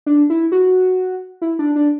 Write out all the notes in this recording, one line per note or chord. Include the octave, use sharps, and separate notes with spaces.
D4
E4
F#4
E4
D4
D4